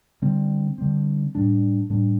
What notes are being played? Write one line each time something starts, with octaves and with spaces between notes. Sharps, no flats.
D3 G3 C4
D3 G3 C4
A2 G3 D4
A2 G3 D4